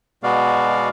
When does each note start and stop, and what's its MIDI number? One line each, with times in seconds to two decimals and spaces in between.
0.23 0.89 47
0.23 0.89 56
0.23 0.89 59
0.23 0.89 66
0.23 0.89 74
0.23 0.89 77